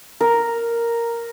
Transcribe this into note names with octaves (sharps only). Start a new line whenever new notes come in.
A#4